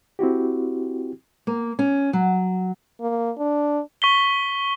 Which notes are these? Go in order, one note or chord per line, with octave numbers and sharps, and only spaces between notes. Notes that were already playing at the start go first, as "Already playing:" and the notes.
C4 E4 F#4 G4
A#3
C#4
F#3
A#3
D4
C#6 B6 G7